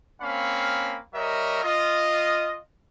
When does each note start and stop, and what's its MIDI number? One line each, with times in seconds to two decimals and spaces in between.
0.22 0.98 58
0.22 0.98 60
0.22 0.98 61
0.22 0.98 77
0.22 0.98 83
1.14 1.63 55
1.14 1.63 70
1.14 1.63 73
1.14 1.63 75
1.14 1.63 76
1.63 2.58 65
1.63 2.58 75